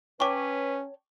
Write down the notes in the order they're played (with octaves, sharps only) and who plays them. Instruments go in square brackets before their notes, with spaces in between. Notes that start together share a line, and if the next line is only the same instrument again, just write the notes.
[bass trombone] C#4 [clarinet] B4 [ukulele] C#5 G5 A5 [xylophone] C#6 D6